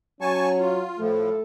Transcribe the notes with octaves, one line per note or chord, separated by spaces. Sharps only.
F#3 C#4 G#5 A5 C#6
F4
A2 F3 A3 A4